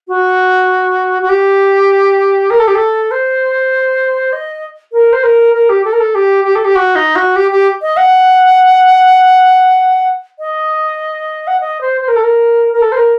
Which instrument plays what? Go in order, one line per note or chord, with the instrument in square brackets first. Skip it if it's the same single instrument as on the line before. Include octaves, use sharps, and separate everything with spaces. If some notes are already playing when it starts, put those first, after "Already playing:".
[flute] F#4
F#4
G4
A#4
A4
G4
A4
C5
D#5
A#4
C5
A#4
A#4
G4
A4
A#4
A4
G4
G4
A4
G4
F#4
D#4
F#4
G4
G4
D#5
F#5
D#5
F#5
D#5
C5
C5
A#4
A4
A#4
A#4
A4
C5
A#4